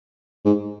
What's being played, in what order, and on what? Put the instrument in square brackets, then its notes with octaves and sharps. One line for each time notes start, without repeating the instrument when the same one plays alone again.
[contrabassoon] G#2